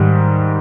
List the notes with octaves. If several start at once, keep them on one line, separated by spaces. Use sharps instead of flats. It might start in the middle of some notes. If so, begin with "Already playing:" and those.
Already playing: G#2 D#3 G3